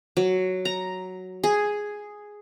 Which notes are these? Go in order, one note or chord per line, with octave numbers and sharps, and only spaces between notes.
F#3
A#5
G#4